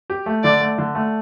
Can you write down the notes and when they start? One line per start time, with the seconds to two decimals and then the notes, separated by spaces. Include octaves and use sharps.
0.10 G4
0.26 A3
0.44 D3 D5
0.60 A3
0.78 D3
0.95 A3